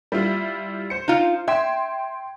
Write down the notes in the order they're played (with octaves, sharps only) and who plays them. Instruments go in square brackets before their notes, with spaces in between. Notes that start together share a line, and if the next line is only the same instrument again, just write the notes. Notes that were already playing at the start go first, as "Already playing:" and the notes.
[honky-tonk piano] G3 E4 F4
C5 C#7
[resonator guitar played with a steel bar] D#4 F4
[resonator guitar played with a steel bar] E5 [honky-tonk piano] G5 C6 G#6